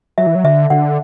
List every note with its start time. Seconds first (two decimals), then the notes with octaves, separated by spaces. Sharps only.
0.18 F#3 E5
0.27 E3
0.35 F#3
0.44 D3 E5
0.70 D3 F#5